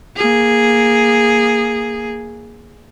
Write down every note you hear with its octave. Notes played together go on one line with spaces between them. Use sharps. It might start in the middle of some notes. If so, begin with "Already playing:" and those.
A#3 G#4